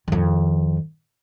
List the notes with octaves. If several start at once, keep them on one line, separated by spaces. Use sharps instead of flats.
F2 D#3